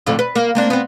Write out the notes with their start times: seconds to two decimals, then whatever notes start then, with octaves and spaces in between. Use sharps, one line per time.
0.07 F2 A2 D3
0.19 B4
0.35 A#3
0.55 A#3 C4 D4
0.70 B3 C4